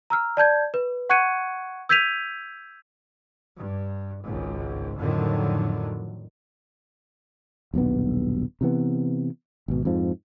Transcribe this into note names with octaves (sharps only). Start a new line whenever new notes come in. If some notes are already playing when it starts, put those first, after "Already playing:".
A#5 E6 F6
D5 A5 G6 G#6
B4
F#5 C#6 F#6 G#6 C#7 D#7
E6 G6 G#6 B6 D#7 F7
G2
G#1 C#2 G#2
F2 A2 D3 D#3 F#3
D#1 B1 G2 B3
C3 E3 B3
G#1 B2
F2 G#2 F3